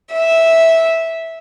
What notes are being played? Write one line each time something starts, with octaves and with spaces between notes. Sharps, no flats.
E5